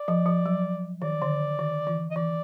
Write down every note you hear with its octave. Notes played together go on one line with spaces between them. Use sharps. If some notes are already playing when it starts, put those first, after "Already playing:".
Already playing: D5
F3
F3
F#3
D#3 D5
D3
D#3
E3
D#5
E3 D5